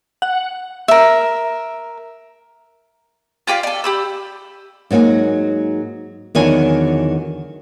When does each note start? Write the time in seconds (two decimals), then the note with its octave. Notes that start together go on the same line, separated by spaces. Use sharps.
0.22 F#5
0.88 A#4 E5
3.47 F4 G4 D5 F5
3.63 A4 D5
3.84 G4 B5 E6
4.91 G#2 F#3 A#3 D#4 G#5
6.35 E2 D3 D#3 F#3 A4 G#5